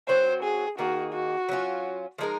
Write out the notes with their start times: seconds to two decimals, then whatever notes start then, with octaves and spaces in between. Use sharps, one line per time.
0.08 F#3 C4 F#4 C5
0.43 G#4
0.78 D#3 A#3 D#4 F#4 G#4
1.13 F#4
1.49 F#3 C#4 F4
2.18 F3 G#3 D#4 A#4